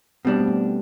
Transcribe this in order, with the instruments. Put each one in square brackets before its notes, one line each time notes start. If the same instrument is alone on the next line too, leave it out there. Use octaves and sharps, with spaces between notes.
[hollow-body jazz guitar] B2 G3 D4 [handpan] C4
[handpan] A3
B3